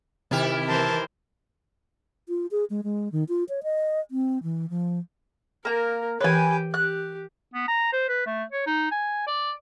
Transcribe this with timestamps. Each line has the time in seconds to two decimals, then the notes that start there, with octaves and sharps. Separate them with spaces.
0.31 C3 D#3 E4 G4 F6
0.68 E3 A#4 C5 A5
2.29 F4
2.51 G#4
2.70 G#3
2.84 G#3
3.12 D#3
3.29 F4
3.49 C#5
3.63 D#5
4.11 C4
4.43 E3
4.70 F3
5.65 A#3 A#4 A#5
6.21 E3 G4 B4 C#5 G5 G#5
6.74 G4 F#6
7.54 B3
7.68 A#5
7.93 C5
8.09 B4
8.26 A3
8.52 C#5
8.67 D#4
8.91 G#5
9.27 D5